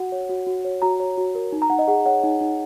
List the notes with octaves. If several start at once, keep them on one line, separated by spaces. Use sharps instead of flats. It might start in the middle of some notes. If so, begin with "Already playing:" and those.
Already playing: F#4 F#5
C#5
F#4
F#4
C#5
F#4 A#5
C#5
F#4
A#4
D#4
A#5
D#4 F#5
D#5
G#4 F#5
C#5 F#5
D#4
D#4